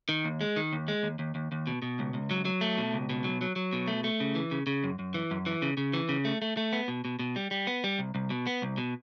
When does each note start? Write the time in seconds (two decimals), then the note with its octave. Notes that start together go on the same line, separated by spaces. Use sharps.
0.09 D#3
0.25 D#2
0.41 G#3
0.56 D#3
0.73 D#2
0.88 G#3
1.03 D#2
1.19 D#2
1.35 D#2
1.52 D#2
1.67 B2
1.82 B2
1.99 C#2
2.14 C#2
2.31 F#3
2.45 F#3
2.61 A3
2.78 B2
2.93 C#2
3.09 B2
3.24 F#3
3.41 F#3
3.56 F#3
3.73 B2
3.88 A3
4.04 A3
4.20 C#3
4.35 E3
4.51 C#3
4.67 C#3
4.84 F#2
4.99 F#2
5.14 E3
5.31 F#2
5.46 E3
5.62 C#3
5.77 C#3
5.93 E3
6.09 C#3
6.25 A3
6.42 A3
6.57 A3
6.73 B3
6.88 B2
7.05 B2
7.19 B2
7.36 G3
7.51 G3
7.67 B3
7.84 G3
7.99 C2
8.15 C2
8.30 B2
8.47 B3
8.62 C2
8.77 B2